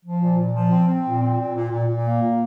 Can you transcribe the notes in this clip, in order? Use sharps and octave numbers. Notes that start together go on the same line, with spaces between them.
F3
A#2
A#2
F3
C4
C4
A#2
C4
A#2
A#2
A#2
A#2
A#3
A#2